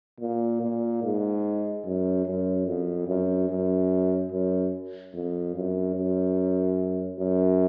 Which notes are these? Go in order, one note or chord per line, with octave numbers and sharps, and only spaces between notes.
A#2
A#2
G#2
F#2
F#2
F2
F#2
F#2
F#2
F2
F#2
F#2
F#2